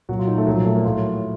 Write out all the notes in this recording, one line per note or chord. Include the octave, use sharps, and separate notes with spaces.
A#2 F#3 F#4
F4
D#4
A3
A#2 F3 F#3
A3
A#3
A2 F#3 F4